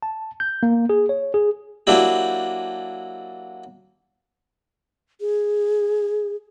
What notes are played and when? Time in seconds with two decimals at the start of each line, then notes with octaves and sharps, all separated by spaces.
0.02 A5
0.40 G6
0.63 A#3
0.89 G#4
1.09 C#5
1.34 G#4
1.87 F#3 A#3 D4 E4 G4
5.21 G#4